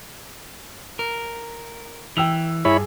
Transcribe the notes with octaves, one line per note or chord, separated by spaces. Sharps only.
A#4
E3 G5 E6 F7
G2 E4 G#4 C#5 B5